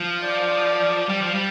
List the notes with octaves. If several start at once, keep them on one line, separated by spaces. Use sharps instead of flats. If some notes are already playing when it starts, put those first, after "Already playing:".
Already playing: F3
D5
G3
F3
G3